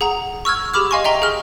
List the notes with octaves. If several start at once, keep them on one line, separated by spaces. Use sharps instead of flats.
G#4 F#5 A#5
C#6 E6 F6 G#6
G4 G#4 B5 D6 F6
D#5 F5 G#5 C6 C#6
D#5 E5 G5 A#5 G7
G#4 F6